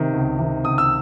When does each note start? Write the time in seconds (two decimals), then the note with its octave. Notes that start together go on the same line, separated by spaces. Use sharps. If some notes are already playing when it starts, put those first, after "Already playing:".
Already playing: C3 D#3
0.13 C#2
0.38 C3 D#3
0.64 C#2 D#6
0.78 E6